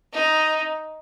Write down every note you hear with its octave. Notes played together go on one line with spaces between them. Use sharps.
D#4